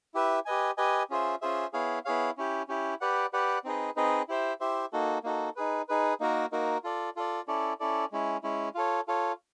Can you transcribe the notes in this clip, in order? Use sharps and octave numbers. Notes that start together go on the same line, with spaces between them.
E4 G4 B4 E5
G4 B4 D#5 G#5
G4 B4 D#5 G#5
C#4 F4 G#4 C5 E5
C#4 F4 G#4 C5 E5
B3 E4 G#4 C#5 F5
B3 E4 G#4 C#5 F5
C#4 E4 G4
C#4 E4 G4
G4 B4 D5 F#5
G4 B4 D5 F#5
C4 D#4 G#4 B4 D#5
C4 D#4 G#4 B4 D#5
E4 G4 C5 E5
E4 G4 C5 E5
A#3 D#4 F#4 A4
A#3 D#4 F#4 A4
D#4 G#4 B4
D#4 G#4 B4
A#3 D#4 F#4 A#4
A#3 D#4 F#4 A#4
F4 A4 D5
F4 A4 D5
C#4 E4 A4 D5
C#4 E4 A4 D5
G#3 C#4 E4
G#3 C#4 E4
F4 A4 C#5
F4 A4 C#5